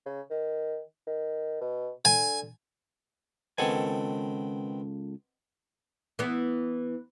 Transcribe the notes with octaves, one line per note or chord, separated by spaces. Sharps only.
C#3
D#3
D#3
B2
D3 G#5
C#2 D#3 B3 C4 A4 G#5
E3 B3